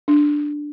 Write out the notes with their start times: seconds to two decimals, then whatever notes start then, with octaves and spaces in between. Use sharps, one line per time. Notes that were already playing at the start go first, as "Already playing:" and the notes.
0.08 D4